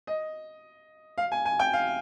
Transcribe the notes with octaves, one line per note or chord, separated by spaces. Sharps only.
D#5
F5
G#5
G#5
G5
F5